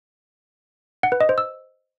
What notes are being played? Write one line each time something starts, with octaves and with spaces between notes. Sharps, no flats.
F#5
B4
D#5
C5
E6